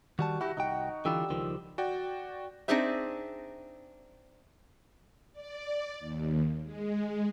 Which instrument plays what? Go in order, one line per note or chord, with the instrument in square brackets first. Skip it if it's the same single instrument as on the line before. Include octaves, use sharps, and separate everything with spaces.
[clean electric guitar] D#3 G3 A5 [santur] F#4
[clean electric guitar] E4 G4 [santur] F#4
[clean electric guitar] C2 G5 [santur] D#4
[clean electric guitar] D3 E3 F4 [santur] G3 E6
[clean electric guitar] C#2 D#3 F3
[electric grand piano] F#4 D5 G5
[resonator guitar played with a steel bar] C4 D4 D#4 G#4 C5 E5
[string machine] D5
D#2
G#3